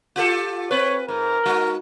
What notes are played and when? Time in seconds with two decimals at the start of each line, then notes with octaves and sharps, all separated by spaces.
0.16 F4 G4 A4
0.71 C4 B4 C#5
1.08 G#2 A#4
1.45 G#3 D#4 F#4